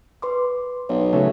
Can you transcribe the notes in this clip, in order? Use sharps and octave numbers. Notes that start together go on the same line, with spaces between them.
B4 C6 D6
B1 C#5
C#3 F#3 A3